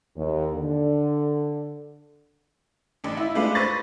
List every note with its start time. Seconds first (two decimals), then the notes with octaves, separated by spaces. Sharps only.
0.16 D#2
0.53 D3
3.04 A1 D4
3.17 E4
3.35 G#3 A3 D4 F4 B4
3.55 B4 C5 C#6 A6 A#6